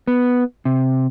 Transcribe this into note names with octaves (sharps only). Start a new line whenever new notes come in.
B3
C3